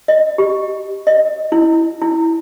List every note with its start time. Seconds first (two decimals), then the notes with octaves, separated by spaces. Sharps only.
0.08 D#5
0.38 G4
1.07 D#5
1.52 E4
2.01 E4